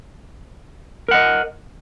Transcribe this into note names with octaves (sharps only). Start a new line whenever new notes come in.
A#4 D#5 F#5